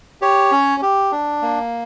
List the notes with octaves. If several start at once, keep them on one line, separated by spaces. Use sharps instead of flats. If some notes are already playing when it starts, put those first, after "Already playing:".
G4 C#5
C#4
G4
D4
A#3